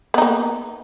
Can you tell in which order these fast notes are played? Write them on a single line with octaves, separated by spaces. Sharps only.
B3 D#4 A#3